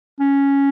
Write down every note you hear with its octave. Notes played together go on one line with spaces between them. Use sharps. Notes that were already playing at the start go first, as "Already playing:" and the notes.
C#4